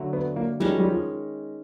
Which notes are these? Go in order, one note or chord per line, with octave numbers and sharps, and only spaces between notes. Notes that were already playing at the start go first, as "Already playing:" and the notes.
Already playing: D3 F#3 A3
B3
A#3
D#3 G3 G#3 C#4
F#3
G3
F3